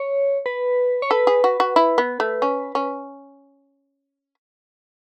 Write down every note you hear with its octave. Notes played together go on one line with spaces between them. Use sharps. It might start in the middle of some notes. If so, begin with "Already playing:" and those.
Already playing: C#5
B4
C#5
A4 B4
G#4
F#4
F#4
E4
B3
A3
C#4
C#4